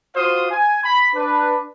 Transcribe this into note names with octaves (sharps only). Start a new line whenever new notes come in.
F4 F#4 C5 F5 D#6
G#5
B5
D4 B4